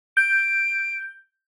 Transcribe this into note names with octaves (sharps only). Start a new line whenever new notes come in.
G6 D7